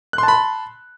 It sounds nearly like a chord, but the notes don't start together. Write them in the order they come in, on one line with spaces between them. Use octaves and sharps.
F#6 C6 A5 B5